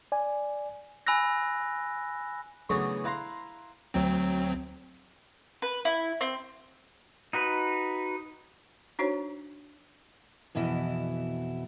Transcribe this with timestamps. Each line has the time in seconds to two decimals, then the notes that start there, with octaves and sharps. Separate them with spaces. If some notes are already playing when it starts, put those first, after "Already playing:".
0.12 D5 G#5
1.07 G#5 B5 E6 F#6 A#6
2.69 C#3 E3 F#3 A3 B3 D4
3.04 E4 B4 F5 A#5 C6
3.94 D2 F#3 C4
5.62 B4
5.85 E4
6.21 C4
7.33 D#4 F#4 B4
8.99 D4 D#4 F#4 C5 C#5
10.55 F2 B2 E3 E4